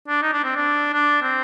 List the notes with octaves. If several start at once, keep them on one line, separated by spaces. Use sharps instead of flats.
D4
D#4
D4
C4
D4
D4
C4